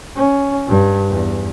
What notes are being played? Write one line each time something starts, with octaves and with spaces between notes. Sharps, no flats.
C#4
G2
E2